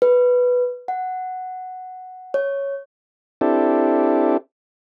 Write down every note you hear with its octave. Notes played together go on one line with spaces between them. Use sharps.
B4
F#5
C#5
C4 D4 E4 G4 A4